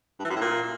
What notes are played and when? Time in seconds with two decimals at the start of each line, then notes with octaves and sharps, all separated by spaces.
0.20 G2
0.25 E3
0.30 F#2
0.36 A2
0.41 A#2